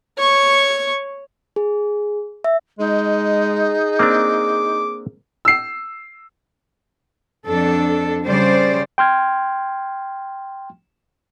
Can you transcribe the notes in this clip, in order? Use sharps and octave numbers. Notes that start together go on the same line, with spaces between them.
C#5 C#6
G#4
E5
G#3 D#4 G#4
A#3 C4 D4 D6
E6 C7
F2 D4 A4
C#3 G3 C5 D5
G5 C6 F6 G#6